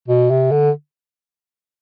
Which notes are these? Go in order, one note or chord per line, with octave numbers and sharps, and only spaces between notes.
B2
C3
D3